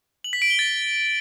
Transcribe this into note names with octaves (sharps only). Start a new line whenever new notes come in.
F#7
B6
D7
G7
A6